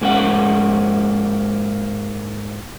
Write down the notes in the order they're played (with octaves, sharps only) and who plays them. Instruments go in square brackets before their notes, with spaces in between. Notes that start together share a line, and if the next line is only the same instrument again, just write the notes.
[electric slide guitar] G#2 G#3 A#3 C#4 F#5